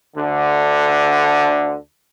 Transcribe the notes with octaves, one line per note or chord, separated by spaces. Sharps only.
D2 D3